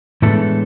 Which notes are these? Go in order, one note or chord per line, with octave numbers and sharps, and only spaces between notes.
A2 E3 G#3 A3 B3 D4 A4